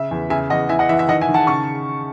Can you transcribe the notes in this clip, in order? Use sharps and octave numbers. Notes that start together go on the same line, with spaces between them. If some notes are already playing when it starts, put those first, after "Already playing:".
Already playing: C#3 E5
E2
C#3 E5 G#5
E2 D#5 F#5
E3 E5 G#5
D#5 F#5
E3 E5
E5
D#3 D#5 F#5
E5 G#5
D#3
F#5 A5
C#3 A5 C#6